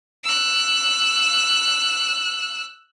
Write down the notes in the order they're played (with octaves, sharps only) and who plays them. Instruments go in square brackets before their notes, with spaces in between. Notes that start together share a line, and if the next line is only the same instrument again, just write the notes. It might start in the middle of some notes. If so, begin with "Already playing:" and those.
[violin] E6 F#6